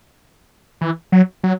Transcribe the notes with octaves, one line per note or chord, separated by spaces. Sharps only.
E3
F#3
F#3